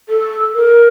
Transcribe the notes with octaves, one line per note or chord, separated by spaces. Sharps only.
A4
A#4